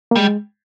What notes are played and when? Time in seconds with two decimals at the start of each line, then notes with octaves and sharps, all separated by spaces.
0.11 A#3
0.16 G3 G#3